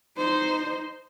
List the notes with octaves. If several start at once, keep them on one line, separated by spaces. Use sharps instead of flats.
D#4 C5